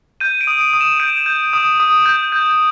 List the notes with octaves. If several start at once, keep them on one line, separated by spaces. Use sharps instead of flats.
G6 D#7
D7
D#6
D7
D#6
E7
G6 D7
G6
D#6
D#6
G6
G6